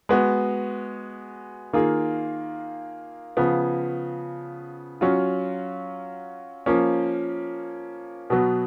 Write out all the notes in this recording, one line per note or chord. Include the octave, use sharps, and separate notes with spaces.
G#3 B3 F#4
D#3 A#3 F4 G#4
C#3 F3 B3
F#3 C#4 F4
F3 A#3 C#4
B2 F#3 B3